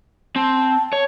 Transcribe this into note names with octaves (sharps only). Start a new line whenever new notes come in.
C4 A5
C#5